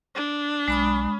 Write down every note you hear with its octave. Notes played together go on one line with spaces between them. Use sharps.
D4
B1 G#3 B5 D#6